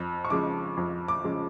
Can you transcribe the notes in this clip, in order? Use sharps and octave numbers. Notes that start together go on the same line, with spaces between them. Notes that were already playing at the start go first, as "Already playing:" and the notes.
Already playing: F2
C#6
C#3 F3 G#3 D6
F2
D6
C#3 F3 G#3